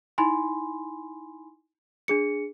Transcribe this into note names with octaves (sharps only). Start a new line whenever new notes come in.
D#4 E4 G#5 B5 C6
D4 G#4 C#7